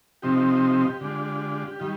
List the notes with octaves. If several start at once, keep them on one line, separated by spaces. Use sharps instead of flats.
C3 F3 C4 D#4 G4
D3 G#3 D4 F4
D#3 G3 F4